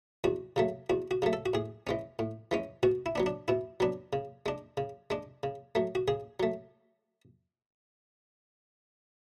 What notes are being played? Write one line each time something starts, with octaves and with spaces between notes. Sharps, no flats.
E2 F#4
C#3 F#3 A3
E2 F#4
F#4
C#3 F#3 A3
A4
F#4
A2 G#4
E3 G#3 C#4
A2
E3 G#3 C#4
B2 F#4
E4
F#3 B3 D4
D4
B2 E4
F#3 B3 D4
C#3
G#3 D4
C#3
G#3 D4
C#3
F#3 A3
F#4
C#3 G#4
F#3 A3